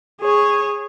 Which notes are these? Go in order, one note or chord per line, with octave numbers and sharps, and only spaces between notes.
G#4 C#5